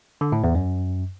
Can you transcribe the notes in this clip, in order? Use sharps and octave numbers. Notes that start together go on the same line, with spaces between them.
D3
A2
E2
F#2